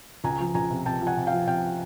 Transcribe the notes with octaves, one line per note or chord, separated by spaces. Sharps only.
C#2 G#5 A#5
F3
C#2 G#5 A#5
C3
C3 G5 A5
F3
F#5 G#5
C3
F5 G5
F3
C3 F5 G5